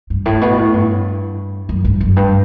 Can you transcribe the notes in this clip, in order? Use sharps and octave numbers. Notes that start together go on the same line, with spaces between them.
G2
A2
B2
A2
G2
F#2
G2
F#2
G2